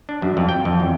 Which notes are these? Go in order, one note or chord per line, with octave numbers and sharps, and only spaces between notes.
D4
F#2
F2
G5
F2
E2